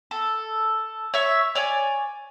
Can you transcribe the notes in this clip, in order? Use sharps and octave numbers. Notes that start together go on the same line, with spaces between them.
A4
C#5 E5 C#6
C#5 D5 G#5